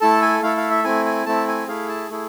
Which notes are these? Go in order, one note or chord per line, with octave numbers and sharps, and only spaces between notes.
A3 E4 A4 A5
G#5
A3 E4 A4 F5
F5
E5
A3 C4 E4 G#5
G#5
A3 C4 E4 A5
G#5
A3 E4 G#4 F5
A5
A3 E4 G#4